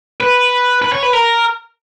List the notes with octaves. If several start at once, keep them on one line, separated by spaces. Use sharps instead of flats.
B4
B4
C#5
B4
A#4